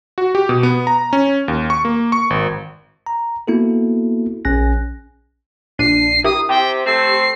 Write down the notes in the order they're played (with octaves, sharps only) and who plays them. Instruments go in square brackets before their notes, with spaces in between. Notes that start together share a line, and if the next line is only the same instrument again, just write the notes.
[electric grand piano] F#4
G4
B2
B3
A#5
C#4
D#2
C#6
A#3
C#6
G#1
[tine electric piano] A#5
A#3 B3 E4 F#4 A4
A#1 C#4 G#5 F#6 A#6
[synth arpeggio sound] A#1 D4 D#7 [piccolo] C7
[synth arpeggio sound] E4 G4 A#4 [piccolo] D#6
[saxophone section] C3 [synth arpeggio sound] G4 [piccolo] G5
[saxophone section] A3 C4 [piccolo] C7